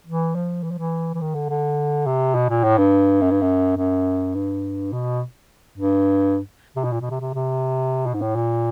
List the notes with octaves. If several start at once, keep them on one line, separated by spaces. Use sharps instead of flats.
E3
F3
E3
F3
E3
E3
D#3
D3
D3
C3
B2
A#2
A2
G2
F#2
G2
F#2
F#2
G2
B2
G2
C3
B2
A#2
B2
C3
C3
C3
B2
G#2
A2
A#2